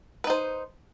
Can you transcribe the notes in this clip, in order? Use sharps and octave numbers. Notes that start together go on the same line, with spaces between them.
D#4 B4 C5